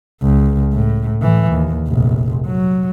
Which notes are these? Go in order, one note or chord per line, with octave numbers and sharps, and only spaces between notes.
C#2
A2
A2 E3
D#2
F1 A#1
F#3